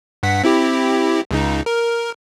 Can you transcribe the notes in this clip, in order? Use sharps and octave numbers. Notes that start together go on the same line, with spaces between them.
G2 F#5 B6
C4 E4 G4
C#2 C#3 D#4
A#4